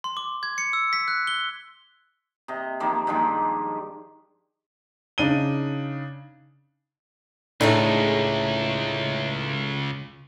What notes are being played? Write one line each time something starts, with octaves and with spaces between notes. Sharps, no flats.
C6
D6
G#6
C#7
E6
B6
F#6
G7
C3 D#5
D#3 F3 A#3
G2 D#3 F3 G#3
C#3 D4 D#4 D#7 G7
C#2 A2 A3 D4 D#4 G#4 C#5 E5